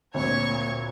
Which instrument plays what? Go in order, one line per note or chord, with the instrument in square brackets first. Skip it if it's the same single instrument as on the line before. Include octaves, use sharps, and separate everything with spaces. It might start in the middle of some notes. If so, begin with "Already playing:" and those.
[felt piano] D2 C4 [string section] A#2 G#6 [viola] C#5 C#6